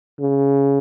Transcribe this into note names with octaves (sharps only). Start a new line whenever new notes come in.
C#3